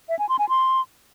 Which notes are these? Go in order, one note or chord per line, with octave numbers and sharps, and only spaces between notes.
E5
G#5
C6
G#5
C6